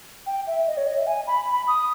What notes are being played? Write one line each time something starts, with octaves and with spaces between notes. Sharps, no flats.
G5
E5
D#5
C#5
D#5
E5
G#5
B5
B5
D#6